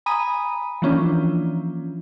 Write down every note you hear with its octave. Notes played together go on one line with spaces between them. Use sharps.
G#5 A#5 B5 D#6 D#7
E3 F3 A#3 C#4 D4 F4